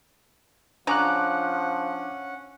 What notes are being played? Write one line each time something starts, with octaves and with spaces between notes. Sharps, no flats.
C#3 F3 C#4 D4 F#5 A#5 D6 F#6